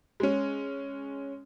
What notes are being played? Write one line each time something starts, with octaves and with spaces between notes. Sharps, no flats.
G#3 C#4